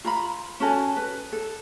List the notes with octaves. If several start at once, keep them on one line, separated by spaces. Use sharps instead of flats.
F4 A#5 B5
C#4 F#4 A4 G#5
B4
A4